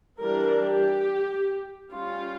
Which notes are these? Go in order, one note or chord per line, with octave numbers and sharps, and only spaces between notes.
E3 G3 D4 A#4
G4
G3 C#4 F4